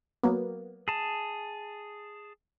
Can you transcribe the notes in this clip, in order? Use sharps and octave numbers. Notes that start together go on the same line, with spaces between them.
F#3 A#3 B3
G#4 A5